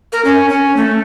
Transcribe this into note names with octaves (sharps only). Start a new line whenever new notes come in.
A#4
C#4
C#4
A3